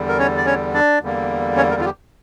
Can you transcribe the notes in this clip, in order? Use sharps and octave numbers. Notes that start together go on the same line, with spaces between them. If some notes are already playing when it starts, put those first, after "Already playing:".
Already playing: E2 D3 G3
A#4
C#4 C#5
D5
C#4 C#5
D4 D5
E2 D3 G3 A#3
C#4 C#5
A#3 A#4
F4
G3 G4